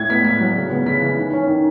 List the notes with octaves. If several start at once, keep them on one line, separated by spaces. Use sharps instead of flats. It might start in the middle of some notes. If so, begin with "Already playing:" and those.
Already playing: A2 G#6
B3 B6
A2 B6
F#3
C#3
B3
C#3 B6
E3
D#3
C#4
D#3